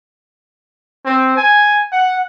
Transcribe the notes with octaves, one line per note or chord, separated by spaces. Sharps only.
C4
G#5
F#5